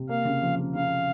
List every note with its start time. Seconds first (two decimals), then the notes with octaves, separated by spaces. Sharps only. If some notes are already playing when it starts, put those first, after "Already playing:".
Already playing: C3
0.09 A#3 F5
0.25 C#3
0.43 F3
0.59 C#3
0.75 C#3 F5